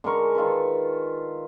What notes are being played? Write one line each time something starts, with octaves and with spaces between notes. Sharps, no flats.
D3 G#3 A#4 C#6
D#3 F4 A4 B4